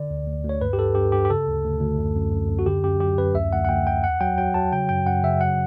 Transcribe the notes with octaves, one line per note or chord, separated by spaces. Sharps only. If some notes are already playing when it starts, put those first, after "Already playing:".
Already playing: D3 D5
D2
D2
D2
C#5
G2 B4
G4
G2 A4
G2 G4
G2 G4
G4
C#3 A4
D2
D2
D2
F#2
F#2
F#2
F#2
F#4
D3 G4
F#2 G4
F#3 G4
F#2 B4
D2 E5
D2 F#5
F#5
D2 G5
D2 G5
E2 F#5
F#3 G5
F#3 G5
F#3 A5
C#3 G5
F#2 G5
F#2 F#5
C#3 E5
F#3 F#5